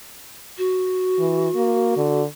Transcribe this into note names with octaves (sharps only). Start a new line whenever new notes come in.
F#4
E3
A#3
D3